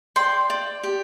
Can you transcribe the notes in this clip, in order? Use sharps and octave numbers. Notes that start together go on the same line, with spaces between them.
D5 G5 C6
D5
G4